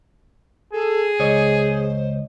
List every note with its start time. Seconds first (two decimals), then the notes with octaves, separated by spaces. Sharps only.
0.73 G#4 A4
1.19 C#2 C5 C#5 D#5